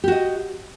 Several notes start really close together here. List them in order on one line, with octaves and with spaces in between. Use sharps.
G4 F#4 D#5